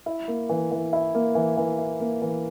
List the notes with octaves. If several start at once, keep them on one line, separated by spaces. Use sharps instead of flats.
E4
A#3
E3
E3
E4
A#3
E3
E3
E4
A#3
E3